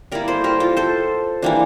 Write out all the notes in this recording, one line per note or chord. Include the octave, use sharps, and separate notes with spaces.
G3 A#3 E4 A#4 D5
A4 C5
G4 A#4
F4 A4
A4 C5
E3 G3 A#3 D4